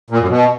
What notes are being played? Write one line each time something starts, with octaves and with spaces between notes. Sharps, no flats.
A#2
F#2
B2